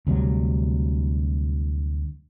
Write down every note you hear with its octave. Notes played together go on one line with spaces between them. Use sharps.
D2 C3 F#3 G3